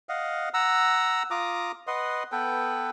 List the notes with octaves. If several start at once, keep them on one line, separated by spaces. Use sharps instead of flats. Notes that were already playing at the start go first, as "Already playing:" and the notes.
D#5 F5 F#5
F#5 A#5 E6
F4 A#5 D6 D#6
B4 D#5 F#5 C6
B3 A4 B4 G5